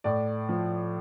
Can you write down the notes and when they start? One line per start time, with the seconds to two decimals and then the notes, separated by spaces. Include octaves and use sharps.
0.04 A2 D5
0.49 F3